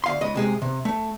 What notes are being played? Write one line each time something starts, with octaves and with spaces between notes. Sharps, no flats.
D2 F5 C6
C#2 D#5
C3 G#3 G#4
C3
A3